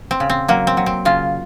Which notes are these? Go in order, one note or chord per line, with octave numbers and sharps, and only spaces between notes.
C4
C#3
C4
F#3 A#3
C4
F#3
C4
C#3 F4